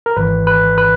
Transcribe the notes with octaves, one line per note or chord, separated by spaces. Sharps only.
A#4
G#1 G#2 E3 B4
B4
B4